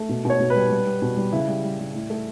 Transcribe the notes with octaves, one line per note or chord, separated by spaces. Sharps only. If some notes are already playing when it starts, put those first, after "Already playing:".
Already playing: A3
B2
B2 C#5
B2
B4
G3
G3
G3
B2
G3
C#3 E4
G3
G3
G3
A2
A3